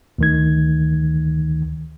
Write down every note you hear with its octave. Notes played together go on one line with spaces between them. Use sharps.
D2 D#3 G#6